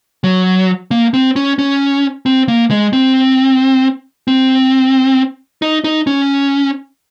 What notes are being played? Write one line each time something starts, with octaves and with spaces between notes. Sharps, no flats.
F#3
A#3
C4
C#4
C#4
C4
A#3
G#3
C4
C4
D#4
D#4
C#4